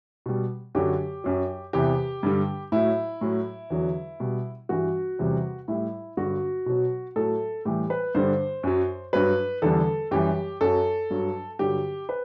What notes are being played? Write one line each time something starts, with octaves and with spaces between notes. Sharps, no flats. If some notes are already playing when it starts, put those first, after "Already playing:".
B2 G3
F#2 D3 F#3 G4
F#2 F#3
E2 C3 E3 G4
G2 D3 G3
A2 F#3 E4
A2 F#3
E2 D3 F#3
B2 G3
G2 E3 G3 F#4
E2 C3 G3
A2 G3 E4
G2 D3 F#3 F#4
B2 F#3
A2 F#3 A4
A2 E3 G3 G4
B4
G2 D3 G3 C5
F#2 F#3
G2 F#3 B4
E2 D3 G3 A4
F#2 E3 G3 G4
F#2 F#3 A4
G2 F#3
G2 D3 F#3 G4
B4